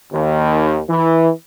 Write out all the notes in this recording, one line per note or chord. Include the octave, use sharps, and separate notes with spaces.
D#2
E3